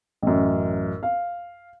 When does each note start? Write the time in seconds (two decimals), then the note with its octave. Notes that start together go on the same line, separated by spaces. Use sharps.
0.22 A1 F#2
1.03 F5